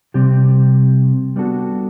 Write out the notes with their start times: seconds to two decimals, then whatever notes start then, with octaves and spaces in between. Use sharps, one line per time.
0.14 C3 G3 C4 G4
1.36 G3 B3 D4 F#4 A4